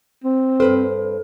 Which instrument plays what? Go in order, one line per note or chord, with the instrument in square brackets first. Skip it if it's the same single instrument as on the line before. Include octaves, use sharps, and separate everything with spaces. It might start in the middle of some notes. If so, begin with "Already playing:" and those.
[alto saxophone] C4
[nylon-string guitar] G2 B4 C5 [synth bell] A4